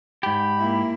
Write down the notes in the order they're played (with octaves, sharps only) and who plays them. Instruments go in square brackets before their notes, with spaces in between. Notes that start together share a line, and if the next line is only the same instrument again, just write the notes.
[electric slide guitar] G#2 G4 [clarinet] B5
[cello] A#3 E4